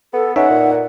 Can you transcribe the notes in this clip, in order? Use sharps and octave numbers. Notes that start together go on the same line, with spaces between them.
B3 A4
C#4 D#4 E5 F#5
A#2